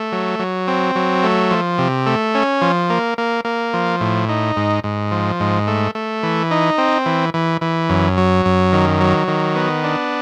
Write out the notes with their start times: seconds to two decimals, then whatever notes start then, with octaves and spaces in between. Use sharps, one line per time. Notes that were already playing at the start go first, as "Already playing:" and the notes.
Already playing: A3
0.12 F#3
0.39 F#3
0.68 C4
0.95 F#3
1.24 A3
1.51 F3
1.78 C3
2.06 A3
2.34 C#4
2.62 F3
2.90 A#3
3.18 A#3
3.45 A#3
3.74 F3
4.01 A2
4.29 D#4
4.56 G#2
4.84 G#2
5.11 F3
5.40 G#2
5.67 A3
5.95 A3
6.23 E3
6.51 D#4
6.78 C4
7.06 E3
7.34 E3
7.61 E3
7.90 F#2
8.17 F#3
8.45 F#2
8.73 D#3
9.01 F#3
9.28 D#3
9.56 B3
9.84 D4